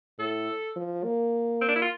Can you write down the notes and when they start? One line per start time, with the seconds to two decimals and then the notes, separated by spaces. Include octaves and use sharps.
0.19 A2 A4
0.76 F3
1.04 A#3
1.61 C4
1.68 D4
1.76 E4
1.82 F4